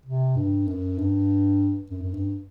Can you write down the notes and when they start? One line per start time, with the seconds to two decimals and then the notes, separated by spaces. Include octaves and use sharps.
0.06 C3
0.37 G2
0.67 F#2
0.98 G2
1.91 F#2
2.03 F#2
2.14 G2